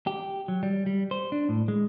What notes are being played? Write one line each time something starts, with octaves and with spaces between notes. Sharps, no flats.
G4
F#3
G3
G3
C5
D4
A2
G#3